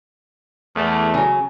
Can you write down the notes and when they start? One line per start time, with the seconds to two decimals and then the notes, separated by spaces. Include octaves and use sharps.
0.75 E2 A3
1.14 C#3 F#3